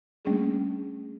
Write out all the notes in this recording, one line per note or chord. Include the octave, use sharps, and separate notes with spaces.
G3 A3 A#3 C#4 D4 G#4